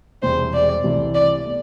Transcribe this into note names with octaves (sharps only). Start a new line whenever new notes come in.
E1 E2 C3 G3 C5
D5
C2 C3 E3 A3
D5
B2 A3